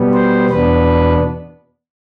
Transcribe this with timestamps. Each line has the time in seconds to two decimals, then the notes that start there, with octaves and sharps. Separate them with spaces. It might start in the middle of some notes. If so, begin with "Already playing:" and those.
Already playing: B2 G3 B3
0.14 C5
0.50 E2 B2 B3 D4 B4